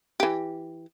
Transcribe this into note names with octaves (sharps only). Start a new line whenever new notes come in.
E3 G4